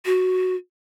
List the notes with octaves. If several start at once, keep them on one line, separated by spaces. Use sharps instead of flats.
F#4